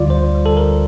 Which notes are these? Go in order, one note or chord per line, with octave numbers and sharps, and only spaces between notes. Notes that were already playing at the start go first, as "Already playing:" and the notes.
Already playing: D2 D3 G3 F4 D5
D2 C5
D3 G3
A4
D2 A#4